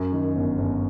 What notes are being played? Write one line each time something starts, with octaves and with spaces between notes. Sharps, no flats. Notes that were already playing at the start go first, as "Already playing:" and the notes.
Already playing: F#2
D#3
G1
G1